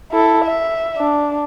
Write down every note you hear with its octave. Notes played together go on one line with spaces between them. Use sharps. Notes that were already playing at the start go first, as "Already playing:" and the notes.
E4 A4
E5
D4